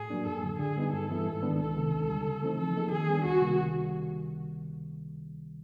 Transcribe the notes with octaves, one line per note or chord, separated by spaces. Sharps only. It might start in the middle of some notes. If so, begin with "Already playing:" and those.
Already playing: A2 G#4
F#3 A#3 D4
F#2 A4
D3 F#3
D3 G#4
G3 B3 D#4
G2 A4
E3 G3 B3 E4
G#2
D#3 G#3 B3 D4
C2 A4
C3 D#3 G#3
D#2
D3 G3
C#3
E3 A3 C4 D#4
F3 A4
A#3 D#4 G#4
D#3 G#4
G3 B3 D4
C#2 F#4
C3 D#3 G3 A#3